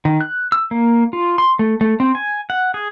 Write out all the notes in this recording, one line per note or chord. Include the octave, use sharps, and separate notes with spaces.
D#3
F#6
E6
A#3
F4
C6
A3
A3
C4
G#5
F#5
G#4